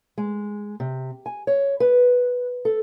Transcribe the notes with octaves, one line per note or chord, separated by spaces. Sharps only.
G#3
C3
G#5
C#5
B4
A4